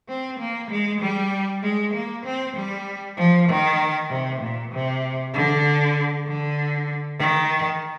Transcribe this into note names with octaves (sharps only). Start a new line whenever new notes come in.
C4
A#3
G#3
G3
G#3
A#3
C4
G3
F3
D#3
C3
A#2
C3
D3
D3
D#3